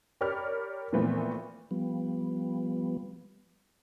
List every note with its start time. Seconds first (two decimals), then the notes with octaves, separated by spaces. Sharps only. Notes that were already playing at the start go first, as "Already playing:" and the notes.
0.21 G4 A#4 C#5 D5 B5 F6
0.93 A#2 E3 F3 A3 B3 C4
1.71 F3 G3 B3